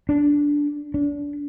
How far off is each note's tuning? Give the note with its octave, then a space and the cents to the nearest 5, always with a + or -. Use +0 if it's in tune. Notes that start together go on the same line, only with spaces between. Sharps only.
D4 -10
D4 -30